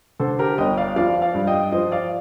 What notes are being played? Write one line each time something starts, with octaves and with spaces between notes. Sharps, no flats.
D3 A4 C5
G4 A#4
G1 D#5 G5
D5 F5
F3 D5 F5
D5 F5
G2
D#5 G5
F3 C5 D#5
D5 F5